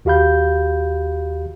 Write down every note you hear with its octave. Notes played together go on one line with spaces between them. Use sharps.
D#2 F#4 G4 F5 B5 G6